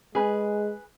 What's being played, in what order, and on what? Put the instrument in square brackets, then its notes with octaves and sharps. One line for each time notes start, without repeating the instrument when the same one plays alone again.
[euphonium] G#3 [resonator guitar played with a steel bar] G#4 B4